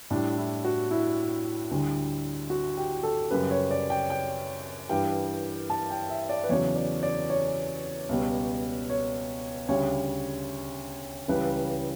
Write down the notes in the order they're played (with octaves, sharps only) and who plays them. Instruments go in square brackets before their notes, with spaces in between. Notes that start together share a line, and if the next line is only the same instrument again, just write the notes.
[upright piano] A2 G3 D4
E4
F#4
E4
D2 D3 G3
F#4
G4
A4
F#2 C#3 G3 B4
C#5
D5
G5
G5
G2 E3 G3 G5
A5
G5
E5
D5
B4
E2 C#3 F#3 C#5
D5
D5
C#5
C#2 B2 G3
C#5
D2 C#3 G3 C#5
C#2 C#3 E3 G3 B4